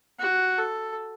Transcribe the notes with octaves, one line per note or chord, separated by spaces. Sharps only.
F#4
A4